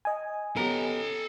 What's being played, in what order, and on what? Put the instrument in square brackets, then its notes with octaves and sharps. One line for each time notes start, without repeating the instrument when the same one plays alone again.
[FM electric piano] D#5 G#5
[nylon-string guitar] B3 C#4 G4 [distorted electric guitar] A4 A#5